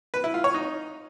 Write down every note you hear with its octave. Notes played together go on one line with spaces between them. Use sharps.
B4
E4
F4
C#5
D#4